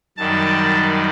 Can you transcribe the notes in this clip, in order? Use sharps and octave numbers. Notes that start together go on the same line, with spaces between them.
F#2 D#3 G3 A5